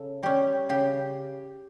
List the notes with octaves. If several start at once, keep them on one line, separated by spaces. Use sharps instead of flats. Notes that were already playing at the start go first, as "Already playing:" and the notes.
Already playing: C#3 A4
G3 C#4 G4
C#3 G4